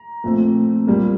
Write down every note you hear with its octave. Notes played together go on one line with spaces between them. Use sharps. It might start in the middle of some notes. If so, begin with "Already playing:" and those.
Already playing: A#5
A#2 F3 A3 C4
A#2 G3 A#3